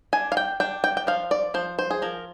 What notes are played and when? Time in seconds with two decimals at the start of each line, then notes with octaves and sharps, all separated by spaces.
0.13 D4 G#5
0.32 F5
0.37 G5
0.60 D4 G5
0.84 G5
0.97 G5
1.07 F3 F5
1.31 D5
1.54 F3 C5
1.79 C5
1.91 G#4
2.02 F3 A#4